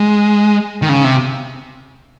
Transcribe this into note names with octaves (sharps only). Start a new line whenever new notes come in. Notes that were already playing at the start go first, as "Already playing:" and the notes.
Already playing: G#3
D#3
C#3
C3